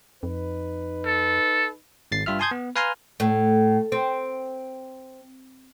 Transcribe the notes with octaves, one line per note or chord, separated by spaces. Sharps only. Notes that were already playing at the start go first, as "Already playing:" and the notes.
F2 D#4 B4
A4
G#1 A6 C7
G2 F4 E5 F6
G#5 A5 C6 D#6 G6 G#6
B3
B4 F5 G#5 A#5 C6 F6
A2
C4